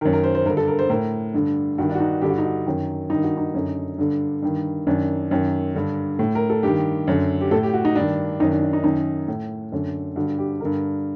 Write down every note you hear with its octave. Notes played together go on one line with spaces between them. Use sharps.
F#2 D#3 A#4
A#4
C5
C5
G2 D3 A#4
A4
A#4
C5
A2 A#4
G2 D3
G2 D#3 F#4
D4
F#4
D#4
G2 D3 G4
F#4
D#4
F#4
F#2 D#3
G2 D#3 D#4
F#4
D#4
F#2 D3
G2 D3
G2 D#3
F#2 D#3 D4
F#2 D#3
G2 D3
A2
A#4
A4
G2 D#3 G4
F#2 D3
G4
A2 A4
G4
F#4
D#4
G2 D#3 D4
F#2 D#3 D#4
D4
D4
D#4
F#2 D#3 D#4
A2
F#2 D3
G2 D3 F#4
G4
G2 D3 A#4